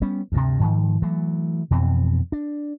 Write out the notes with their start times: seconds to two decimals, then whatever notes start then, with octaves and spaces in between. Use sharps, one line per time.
0.02 G3 B3 C#4
0.32 D2 G2 C3
0.60 G#2 D#3 F3
1.02 E3 F#3 A3
1.71 F2 B2 E3 C4
2.32 D4